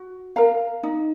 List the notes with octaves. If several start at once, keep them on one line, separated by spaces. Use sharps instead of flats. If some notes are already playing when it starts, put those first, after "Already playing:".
Already playing: F#4
A#4 F5 A#5
D#4